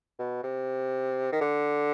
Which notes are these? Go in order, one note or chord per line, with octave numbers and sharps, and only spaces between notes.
B2
C3
D#3
D3